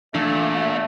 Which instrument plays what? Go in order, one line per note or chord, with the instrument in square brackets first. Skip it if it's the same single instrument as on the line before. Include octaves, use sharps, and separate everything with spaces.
[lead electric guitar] A#2 [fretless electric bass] E3 D4 [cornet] A3 [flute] E5